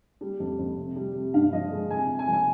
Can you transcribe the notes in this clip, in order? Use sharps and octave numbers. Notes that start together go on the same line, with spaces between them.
G3
F2
F2
C3
G3
C3
G2 F5
F3 D#5
G#3
C3 G#5
C3
G#5
F3
G#5